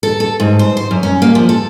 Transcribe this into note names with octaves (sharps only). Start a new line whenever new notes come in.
A4
A4
G#2
C5
C5
F#2
C#4
A#3
F3
A4